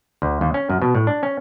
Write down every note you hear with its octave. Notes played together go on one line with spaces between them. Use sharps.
D2
D#2
C#4
F#2
B2
A2
D4
C#4